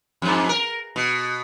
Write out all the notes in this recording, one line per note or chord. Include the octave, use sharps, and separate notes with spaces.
F2 G#2
A#4
B2